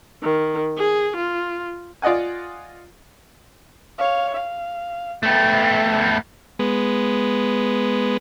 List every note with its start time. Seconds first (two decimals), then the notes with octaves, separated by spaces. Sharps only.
0.23 D#3
0.78 G#4
1.16 F4
2.02 F4 D5 D#5 F#5 G#5
3.98 C#5 F5
4.34 F5
5.23 A3 B3 G5
6.59 G#3 B3